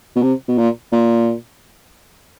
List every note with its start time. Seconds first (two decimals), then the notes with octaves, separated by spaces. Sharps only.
0.16 B2
0.23 C3
0.48 B2
0.58 A#2
0.92 A#2